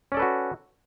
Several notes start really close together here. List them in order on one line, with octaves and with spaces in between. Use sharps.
C#4 D5 A4 B4 F#4